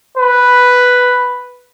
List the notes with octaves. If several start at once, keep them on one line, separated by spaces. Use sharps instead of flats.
B4